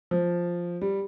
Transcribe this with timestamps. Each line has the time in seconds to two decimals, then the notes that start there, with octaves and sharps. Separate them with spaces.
0.11 F3
0.81 G3